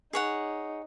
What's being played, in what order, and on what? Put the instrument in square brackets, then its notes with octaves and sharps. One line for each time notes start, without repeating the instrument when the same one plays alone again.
[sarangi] D#4 [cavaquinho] G#4 C#5 F#5